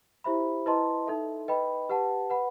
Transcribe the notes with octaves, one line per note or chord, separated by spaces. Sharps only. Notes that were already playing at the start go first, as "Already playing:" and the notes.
E4 G4 C5 E5 B5
E4 B4 D#5 A5 C6
D#4 A4 E5
B4 D#5 G5 B5
G4 B4 F#5 A5
B4 F#5 B5